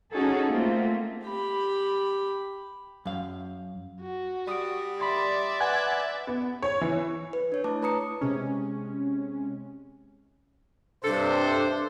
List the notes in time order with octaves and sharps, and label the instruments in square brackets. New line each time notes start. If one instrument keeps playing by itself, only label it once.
[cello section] C#4 D#4 F#4 G#4 A4
A3 A#3 C4 F4
[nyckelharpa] G4 B5
[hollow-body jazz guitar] F#2 F5
[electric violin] F#4
[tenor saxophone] G3 [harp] D#6 D7
[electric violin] D5 E5 [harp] B5 C6 A6
[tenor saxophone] B4 [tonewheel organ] F#5 G#5
[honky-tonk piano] B3
C#5
E3
[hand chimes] B4
D4 C#5
A3 E4 A5 D6
E4 B4 A#5 D#6 C#7
[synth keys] C3 G#3 C#4
[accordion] G2 C3 [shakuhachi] D4 [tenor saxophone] A4 [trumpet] C5